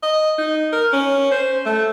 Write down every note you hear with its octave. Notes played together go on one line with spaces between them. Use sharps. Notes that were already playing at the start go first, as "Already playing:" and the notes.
D#5
D#4
A#4
C#4
C5
A3